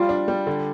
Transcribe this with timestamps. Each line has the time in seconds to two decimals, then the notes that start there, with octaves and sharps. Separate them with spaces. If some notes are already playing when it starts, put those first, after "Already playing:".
Already playing: G3 F4
0.09 D4
0.28 G3
0.47 D3